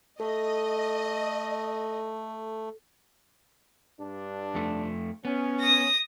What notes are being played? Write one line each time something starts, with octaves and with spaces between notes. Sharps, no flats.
A3 A4 D#5
G2 D4
F2 A3
B3 C#4
D#6 A#6